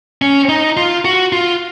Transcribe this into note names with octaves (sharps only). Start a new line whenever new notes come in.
C#4
D#4
F4
F#4
F4